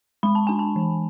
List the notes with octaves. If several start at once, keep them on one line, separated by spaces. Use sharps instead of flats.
G#3 B5
A5
D4 G#5
A5
E3